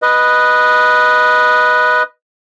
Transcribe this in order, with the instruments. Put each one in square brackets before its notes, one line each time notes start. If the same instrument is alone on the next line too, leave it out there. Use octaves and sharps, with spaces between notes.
[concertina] B4 D#5